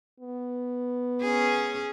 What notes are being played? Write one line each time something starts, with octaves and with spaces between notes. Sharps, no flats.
B3
C#4 G#4